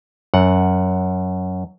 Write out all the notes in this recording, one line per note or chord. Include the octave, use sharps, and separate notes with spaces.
F#2 F#5